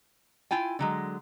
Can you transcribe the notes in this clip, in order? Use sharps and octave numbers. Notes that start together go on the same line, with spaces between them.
E4 F4 G5 G#5
D3 F#3 G#3